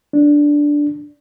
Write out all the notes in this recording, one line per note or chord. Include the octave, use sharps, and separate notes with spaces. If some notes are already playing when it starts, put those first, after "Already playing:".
D4